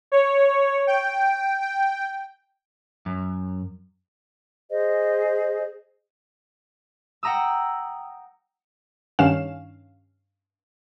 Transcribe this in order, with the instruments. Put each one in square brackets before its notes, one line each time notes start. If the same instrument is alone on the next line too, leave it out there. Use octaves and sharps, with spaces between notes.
[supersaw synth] C#5
G5
G5
[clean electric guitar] F#2
[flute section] G#4 C5 D#5
[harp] F#5 G5 A#5 D#6 E6
[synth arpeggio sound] G2 D#3 C#4 F5 E7